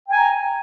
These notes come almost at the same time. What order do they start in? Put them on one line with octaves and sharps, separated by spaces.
G5 G#5 A#5